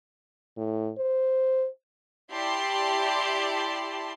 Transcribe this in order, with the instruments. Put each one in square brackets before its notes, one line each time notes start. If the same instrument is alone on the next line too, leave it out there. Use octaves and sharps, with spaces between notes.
[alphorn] A2
C5
[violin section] E4 G4 D5 A5 C6